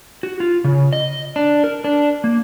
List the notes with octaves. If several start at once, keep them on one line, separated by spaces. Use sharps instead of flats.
F#4
F4
C#3
D#5
D4
A#4
D4
A#3